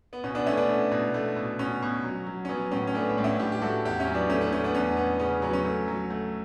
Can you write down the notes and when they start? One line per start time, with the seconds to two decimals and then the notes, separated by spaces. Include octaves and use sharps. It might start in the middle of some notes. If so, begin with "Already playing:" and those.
0.13 B3
0.24 B2 C#4
0.35 B3 D4
0.46 A3 C#4 E4
0.57 B3 D4
0.69 A3
0.91 B2
1.14 A3
1.36 B2
1.59 B2 C#4
1.82 B2
2.04 F#3
2.26 F#3
2.45 C#4
2.49 F#3 B3
2.71 A2 C#4
2.87 C#4
2.94 A3 B3 D4
3.09 B3 D4
3.18 A2
3.24 C#4 E4
3.39 A2 E4 G4
3.52 G4
3.62 A2 F#4 A4
3.85 E2 E4 G4
4.00 C#4 E4
4.07 F#3
4.14 B3 D4
4.30 A3 C#4
4.41 B3
4.52 A3 C#4
4.64 B3 D4
4.75 E2 C#4
4.97 E2 B3
5.20 C#3 C#4
5.42 F#3 B3
5.53 C#4
5.65 A3
5.88 F#3
6.10 A3